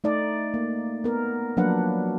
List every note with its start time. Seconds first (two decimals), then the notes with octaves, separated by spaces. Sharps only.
0.04 A3 D#4 D5
0.54 A#3
1.04 B3 A#4
1.57 F3 F#3 A#3 D4 B4 F#5